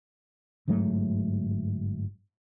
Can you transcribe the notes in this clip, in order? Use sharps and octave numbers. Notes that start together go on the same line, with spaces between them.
G1 G#2 F#3 A3